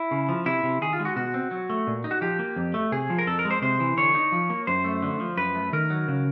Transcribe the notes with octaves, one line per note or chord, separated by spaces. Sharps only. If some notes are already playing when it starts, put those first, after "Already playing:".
Already playing: E4
C#3
F3
C3 E4
C3
D#3 G#4
F4
G#3
F#4
B2 F#4
C4
F#3
A3
A#2
D#4
F#4
F3 G4
A#3
F2
A3
C3 G#4
F3
A#4
F2 A4
A#4
G#3
C5
C3 C5
E3
D3 C#5
D#4
F3
A#3
F#2 C5
A3
D3
F3
F#2 B4
A3
D#3 A#4
F#3
C#3